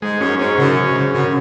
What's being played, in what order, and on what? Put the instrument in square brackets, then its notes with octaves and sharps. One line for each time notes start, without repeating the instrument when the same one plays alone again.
[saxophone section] G#2 [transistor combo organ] G#3
[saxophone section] F#2 [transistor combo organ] C#4
[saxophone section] G#2 [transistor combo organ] C#4
[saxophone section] F#2 [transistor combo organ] C#3
[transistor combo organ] C#4
[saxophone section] G#2
[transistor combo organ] C#3
[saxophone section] F#2 [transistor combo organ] C#3